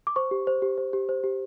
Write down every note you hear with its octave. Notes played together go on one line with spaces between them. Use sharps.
D6
C5 C#6
G4
C5
G4
C5
G4
C5
G4